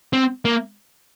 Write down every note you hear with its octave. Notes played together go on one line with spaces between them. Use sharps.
C4
A#3